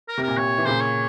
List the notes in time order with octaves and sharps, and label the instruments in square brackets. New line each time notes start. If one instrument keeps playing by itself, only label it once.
[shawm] A#4
[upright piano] C3
[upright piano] A#2 [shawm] A#4
[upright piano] C3 [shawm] C#5
[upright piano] E3
[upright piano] A#2 C#3 [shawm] C5
[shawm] C#5